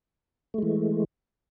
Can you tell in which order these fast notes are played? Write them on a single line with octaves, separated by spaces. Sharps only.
A3 G#3 E3